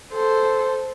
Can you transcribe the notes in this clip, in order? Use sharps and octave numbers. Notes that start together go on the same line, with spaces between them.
A4 C5